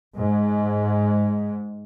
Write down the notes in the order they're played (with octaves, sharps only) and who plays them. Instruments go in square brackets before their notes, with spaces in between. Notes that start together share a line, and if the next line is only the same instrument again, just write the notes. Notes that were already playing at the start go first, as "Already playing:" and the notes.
[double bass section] G#2